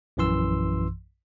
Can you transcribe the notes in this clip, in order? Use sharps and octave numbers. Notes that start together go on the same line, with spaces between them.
A#1 F#2 E3 C6 E6